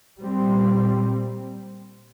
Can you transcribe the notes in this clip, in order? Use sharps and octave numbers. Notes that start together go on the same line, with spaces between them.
A#2 G3 C4